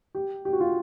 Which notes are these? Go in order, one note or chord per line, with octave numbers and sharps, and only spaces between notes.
G4
G4
F#4
F4